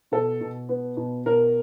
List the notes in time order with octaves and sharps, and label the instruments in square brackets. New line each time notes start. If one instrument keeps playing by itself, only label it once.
[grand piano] B2 A4
B2
B3
B2
B2 A#4